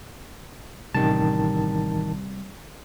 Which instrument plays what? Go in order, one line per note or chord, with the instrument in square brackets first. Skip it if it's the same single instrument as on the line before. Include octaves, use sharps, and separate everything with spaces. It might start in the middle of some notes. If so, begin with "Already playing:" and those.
[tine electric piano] A1 D#3 A5 [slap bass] C3 G3